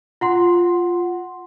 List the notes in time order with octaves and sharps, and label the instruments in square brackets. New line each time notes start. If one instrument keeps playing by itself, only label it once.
[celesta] F4 F#5 C6